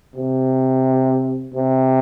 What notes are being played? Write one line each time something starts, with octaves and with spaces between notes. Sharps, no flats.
C3
C3